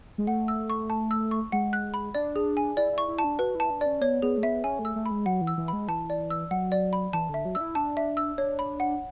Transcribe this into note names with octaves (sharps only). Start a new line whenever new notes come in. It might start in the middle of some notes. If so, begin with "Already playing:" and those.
G#3
A3 F#5
E6
C#6
A5
E6
C#6
G#3 F#5
F#6
B5
D4 D5
G#4
G#5
E4 D5
E4
C#6
E4
A5
D4
F#4 B4
E4 A5
D4
C#4 D5
B3 C#5
B3 G#4
A3
B3 E5
C#4 G#5
A3
E6
A3
B5
G#3
F#3 F#5
E3
E6
E3
G#3 B5
E3 A5
D5
E6
F#3 F#5
D5
B5
E3 A5
D3 E5
F#3
D4 E6
E4
D4 A5
E5
E6
D4 C#5
B5
F#5